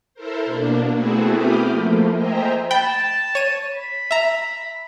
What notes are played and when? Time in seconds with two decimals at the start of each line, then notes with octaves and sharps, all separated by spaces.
0.14 E4 A4 A#4 C5
0.45 B2 A#3 D4
0.94 A3 B3 C4 E4 F#4 G#4
1.32 B5 D6 D#6 F6 G6
1.66 F3 A3 A#3
2.12 C5 D#5 E5 G5 G#5 A#5
2.71 G5 A5 B5
3.35 C#5 D#7
3.73 B5
4.11 E5 A#5